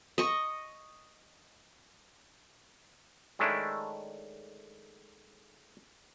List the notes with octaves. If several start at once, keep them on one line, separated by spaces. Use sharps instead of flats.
D#5 C#6
D#3 G#3 A3 C#4 D4 E4